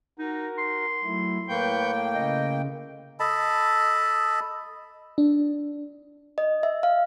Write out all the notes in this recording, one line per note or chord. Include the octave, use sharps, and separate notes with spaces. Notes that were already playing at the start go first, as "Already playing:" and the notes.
D#4 F#4 A#4
C6
F#3 A3 E4
A2 A#3 B4 G5 C#6 G6
C#3 D#5
A4 D#5 A5 B5
D4
D#5
E5
F5